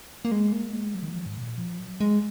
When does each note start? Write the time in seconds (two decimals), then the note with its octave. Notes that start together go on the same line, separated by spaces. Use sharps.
0.25 A#3
0.31 G#3
0.52 A#3
0.73 G#3
0.95 F#3
1.03 D#3
1.10 F3
1.26 G#2
1.37 B2
1.42 A#2
1.58 F3
1.78 F#3
2.00 G#3